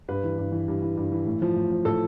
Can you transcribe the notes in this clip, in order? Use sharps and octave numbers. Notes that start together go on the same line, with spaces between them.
G2 B4
E3
G2
E3
G2
E3
G2
E3
A2
F3
A2
F3
A2 A4